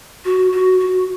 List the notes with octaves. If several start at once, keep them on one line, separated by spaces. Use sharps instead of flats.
F#4
F#4
F#4